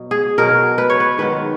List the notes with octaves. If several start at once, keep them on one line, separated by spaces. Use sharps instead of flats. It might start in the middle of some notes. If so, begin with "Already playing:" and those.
Already playing: B2 F#3
G#4
B2 F#3 A#4
B4
C#5
B4
G#2 D#3 F#3 B4